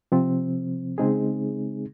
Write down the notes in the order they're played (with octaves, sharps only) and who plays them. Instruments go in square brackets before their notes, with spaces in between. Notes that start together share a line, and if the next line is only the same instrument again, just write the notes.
[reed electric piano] C3 F3 C4
C#3 G#3 C4 D#4 G#4